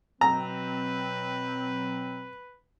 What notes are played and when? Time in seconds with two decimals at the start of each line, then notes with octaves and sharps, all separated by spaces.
0.21 B2 F#3 C4 B4 A#5